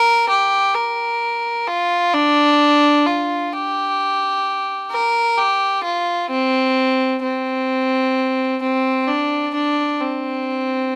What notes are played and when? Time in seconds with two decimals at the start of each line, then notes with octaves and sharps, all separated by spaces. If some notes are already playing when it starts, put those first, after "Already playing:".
Already playing: A#4
0.29 G4
0.75 A#4
1.67 F4
2.14 D4
3.07 F4
3.53 G4
4.92 A#4
5.38 G4
5.84 F4
6.31 C4
7.23 C4
8.62 C4
9.07 D4
9.54 D4
10.01 C4